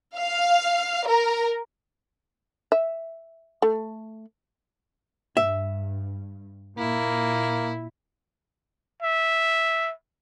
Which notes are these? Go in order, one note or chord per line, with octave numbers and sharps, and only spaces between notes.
F5
A#4
E5
A3
G2 E5
A#2 A#3 E4
E5